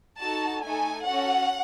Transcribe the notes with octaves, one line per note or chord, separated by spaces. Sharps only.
D#4 F#4 A4 A5
A3 D#4 A4 G#5
C#4 F#4 A4 F#5